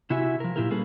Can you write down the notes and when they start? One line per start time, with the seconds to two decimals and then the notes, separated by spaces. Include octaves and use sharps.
0.10 C3 E4 F#4 G4 E5 G#5
0.40 F3 A#4
0.56 A#2 E4 G4 A#4
0.70 G3 A#3 C#4 G#4 A4 B4